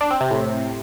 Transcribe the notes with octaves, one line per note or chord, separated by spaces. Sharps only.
D4
C4
C3
A2